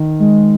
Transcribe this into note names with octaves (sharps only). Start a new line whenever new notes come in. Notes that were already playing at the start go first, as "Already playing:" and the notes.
Already playing: D#3
G#3